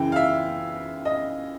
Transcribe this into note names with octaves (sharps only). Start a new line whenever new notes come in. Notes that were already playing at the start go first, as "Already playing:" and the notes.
Already playing: F#2 C#3 E3 G5
F5
E5
D#5